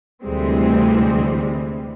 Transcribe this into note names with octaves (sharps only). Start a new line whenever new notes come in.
D2 C3 E3 G3 G#3 C4